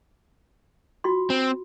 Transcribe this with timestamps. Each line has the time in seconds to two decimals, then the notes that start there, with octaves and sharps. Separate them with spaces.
1.04 F4 F#4 C6
1.30 C4